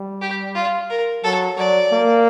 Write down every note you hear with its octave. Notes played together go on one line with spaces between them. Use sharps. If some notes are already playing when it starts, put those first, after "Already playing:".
Already playing: G3
G4
F4
A#4
F#3 A4
F#3 D5
A#3